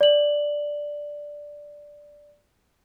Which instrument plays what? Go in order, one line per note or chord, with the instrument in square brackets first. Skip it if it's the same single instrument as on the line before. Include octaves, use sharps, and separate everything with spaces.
[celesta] D5 F#7